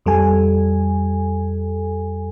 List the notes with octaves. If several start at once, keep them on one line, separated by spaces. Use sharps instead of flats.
F2 G3 A4 G#5